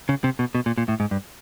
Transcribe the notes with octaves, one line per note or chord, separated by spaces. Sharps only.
C#3
C3
B2
B2
A#2
A#2
A2
G#2
G2